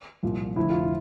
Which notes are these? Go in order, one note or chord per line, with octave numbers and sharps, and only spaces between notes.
C2 A#2 F3
F1 F2 D3 E4
F4
E4